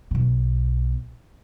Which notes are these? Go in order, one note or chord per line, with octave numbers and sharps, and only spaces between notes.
B1 B2